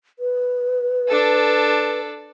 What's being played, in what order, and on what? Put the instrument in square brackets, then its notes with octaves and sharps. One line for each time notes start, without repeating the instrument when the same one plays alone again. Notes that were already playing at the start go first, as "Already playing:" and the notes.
[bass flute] B4
[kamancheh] D4 A4